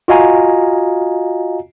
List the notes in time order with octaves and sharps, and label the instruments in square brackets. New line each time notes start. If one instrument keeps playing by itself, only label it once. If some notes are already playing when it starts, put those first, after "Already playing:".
[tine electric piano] F4 F#4 D#5 F5 G#5 A#5